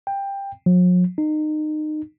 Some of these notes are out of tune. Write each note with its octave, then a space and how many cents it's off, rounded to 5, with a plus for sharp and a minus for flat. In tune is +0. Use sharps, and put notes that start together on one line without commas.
G5 +15
F#3 -45
D#4 -25